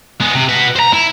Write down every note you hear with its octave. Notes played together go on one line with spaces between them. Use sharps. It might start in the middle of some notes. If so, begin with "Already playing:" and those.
G#3 B3
C3
F#4 B4
C5 A#5
E4